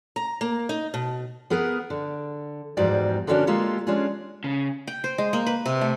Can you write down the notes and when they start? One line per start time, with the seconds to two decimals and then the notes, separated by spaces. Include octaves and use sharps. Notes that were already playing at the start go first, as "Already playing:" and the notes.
0.16 A#5
0.41 A#3
0.69 D#4
0.94 B2
1.50 B3 G#4 A#4 B4 F#5
1.90 D3
2.77 E2 G#2 F3 G3 F#4 D5
3.27 D3 A#3 C#4 D4 F#4 A#4
3.47 G#3 A#3 F4 G4 A4
3.87 G#3 C#4 D4 F4 G#4
4.44 C#3
4.87 G5
5.04 C5
5.18 G#3
5.33 A#3
5.47 B4
5.66 C3
5.81 A3